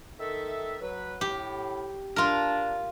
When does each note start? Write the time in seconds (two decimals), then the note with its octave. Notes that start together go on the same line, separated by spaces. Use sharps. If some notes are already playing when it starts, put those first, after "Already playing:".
0.19 D#3 A4 E5
0.81 F#3 B4
1.21 A2 G4
2.16 D4 F4 A#4